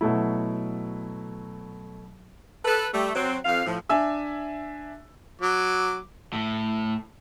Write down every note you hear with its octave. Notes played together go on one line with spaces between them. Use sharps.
B2 F#3 A3 E4
A4 B4
G3 A3
F#3 C4
F2 F5
A2 F3
D4 E5 G#5 E6
F#3 D6
A2